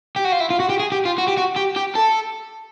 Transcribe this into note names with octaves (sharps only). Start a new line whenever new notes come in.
G4
F#4
F4
E4
F4
F#4
G4
G#4
G4
F4
F#4
G4
F#4
G4
G4
A4